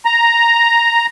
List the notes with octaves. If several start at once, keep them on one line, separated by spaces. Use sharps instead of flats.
A#5